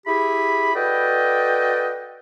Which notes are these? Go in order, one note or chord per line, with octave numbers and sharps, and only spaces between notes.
E4 G4 G#4 B5
F#4 A4 B4 D5 D#5 G5